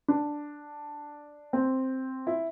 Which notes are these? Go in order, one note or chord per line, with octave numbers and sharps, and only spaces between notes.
D4
C4
E4